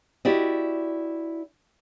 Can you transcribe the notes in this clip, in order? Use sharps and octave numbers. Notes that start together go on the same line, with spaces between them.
E4 F#4 G4 D5 D#5